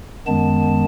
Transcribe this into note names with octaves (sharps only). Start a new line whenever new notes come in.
F#2 D#3 G#3 B3 A5